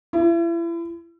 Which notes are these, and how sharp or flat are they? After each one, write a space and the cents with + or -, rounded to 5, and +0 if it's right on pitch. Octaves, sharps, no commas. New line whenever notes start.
E4 +35